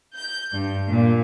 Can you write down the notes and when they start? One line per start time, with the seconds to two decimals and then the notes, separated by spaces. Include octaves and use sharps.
0.15 G6
0.53 G2
0.88 A#2